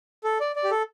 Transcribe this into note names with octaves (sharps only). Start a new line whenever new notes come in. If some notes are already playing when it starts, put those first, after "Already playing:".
A4
D5
D5
G4
A4